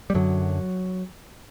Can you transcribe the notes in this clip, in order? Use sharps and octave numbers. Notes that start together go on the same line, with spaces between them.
G3
F#2 D3 F#3